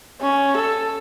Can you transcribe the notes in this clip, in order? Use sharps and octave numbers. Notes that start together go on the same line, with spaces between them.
C#4
A4